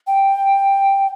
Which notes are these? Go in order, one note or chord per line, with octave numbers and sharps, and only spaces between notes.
G5